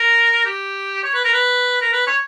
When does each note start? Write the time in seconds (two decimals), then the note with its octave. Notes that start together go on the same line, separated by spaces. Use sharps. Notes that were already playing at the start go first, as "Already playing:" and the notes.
Already playing: A#4
0.46 G4
1.04 C#5
1.14 B4
1.24 A#4
1.33 B4
1.81 A#4
1.92 B4
2.07 C#5